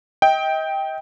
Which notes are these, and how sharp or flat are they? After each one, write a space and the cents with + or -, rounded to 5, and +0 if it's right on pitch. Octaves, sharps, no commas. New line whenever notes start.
D#5 +35 G5 +0